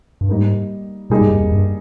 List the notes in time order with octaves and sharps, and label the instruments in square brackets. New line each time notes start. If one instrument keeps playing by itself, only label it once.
[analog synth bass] G2
[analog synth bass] G#2 [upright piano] G3 A#3 D#4 A#4
[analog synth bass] A#2 [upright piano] G3 A#3 D#4 G#4
[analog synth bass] G#2
G2
F2
G2